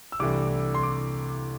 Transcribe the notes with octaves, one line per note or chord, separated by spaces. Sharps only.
E6
C2 C3 E3 A3 D4 D6
C6
D6